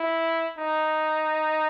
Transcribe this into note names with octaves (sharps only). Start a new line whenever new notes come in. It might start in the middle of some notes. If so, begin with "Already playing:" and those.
Already playing: E4
D#4